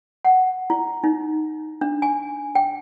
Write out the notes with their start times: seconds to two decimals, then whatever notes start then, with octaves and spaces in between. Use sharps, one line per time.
0.25 F#5
0.70 E4
1.04 D#4
1.81 D4
2.02 G#5
2.55 G5